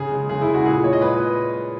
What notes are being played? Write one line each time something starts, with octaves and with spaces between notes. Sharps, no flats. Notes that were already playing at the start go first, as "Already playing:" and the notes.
Already playing: C#3 G#4
G#3
C#3 G#4
E4
G#3
F#4
A#2 G#4
G#3 C#5
D#5
A#2 B4